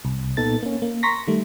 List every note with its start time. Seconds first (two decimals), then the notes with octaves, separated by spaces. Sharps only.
0.05 C2
0.37 A#2 B3 D#4 A4 A6
0.63 A#3 C#4
0.82 A#3
1.03 A#5 C6 C#6 A#6 B6
1.27 D#3 G3 A3